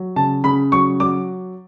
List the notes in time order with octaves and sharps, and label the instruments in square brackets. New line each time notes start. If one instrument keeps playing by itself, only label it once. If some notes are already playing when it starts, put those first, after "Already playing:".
Already playing: [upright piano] F#3
C#3 A5
C#3 B5
F#3 C#6
F#3 D6